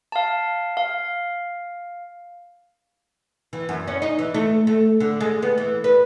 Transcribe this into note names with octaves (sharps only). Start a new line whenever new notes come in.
F5 A5
F5
E3
F#2
C#4
D#4
E3
A3
A3
D3
G#3
B3
E3
B4